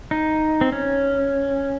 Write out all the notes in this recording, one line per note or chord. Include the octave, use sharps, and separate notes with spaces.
D#4
C4
C#4